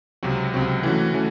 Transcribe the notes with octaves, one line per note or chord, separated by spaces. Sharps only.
C#2 C3 F#3 C4 F#4
C#2 C3 F#3 C4 F#4
E3 A3 C#4 F#4
E3 A3 C#4 F#4